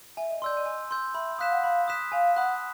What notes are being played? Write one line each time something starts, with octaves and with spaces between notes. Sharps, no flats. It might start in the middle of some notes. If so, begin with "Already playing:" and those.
E5 G#5
D#5
D5 C6 E6 G6
D#5
G#5
C6 E6 G6
E5 B5
F5 D#6 F#6 B6 E7
F#5
F5 B5
D#6 F#6 B6 E7
F5 G#5
F#5 B5 D#6 F#6